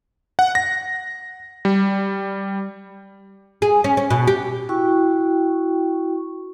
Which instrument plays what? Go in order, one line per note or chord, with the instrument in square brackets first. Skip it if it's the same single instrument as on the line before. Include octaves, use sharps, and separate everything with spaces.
[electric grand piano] F#5
A#6
G3
[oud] G#4
C#4
C#4
B2
G4
[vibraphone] E4 F#4 G5 C#6